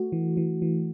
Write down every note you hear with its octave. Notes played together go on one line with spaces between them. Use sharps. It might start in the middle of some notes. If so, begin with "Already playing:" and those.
Already playing: A3 F#4
E3
E3
E3